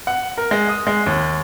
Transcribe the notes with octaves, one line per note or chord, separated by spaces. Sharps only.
F#5
A#4
G#3
D#6
G#3
D#2